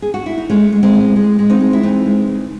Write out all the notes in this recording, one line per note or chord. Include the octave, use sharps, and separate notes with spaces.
G#4
F#4
E4
D#4
G#3 A3 C#4
G#3
G#3 C4
A2
G#3
G#3
C4 D#4
G#3
E4
E3 C4 D#4
G#3
C#3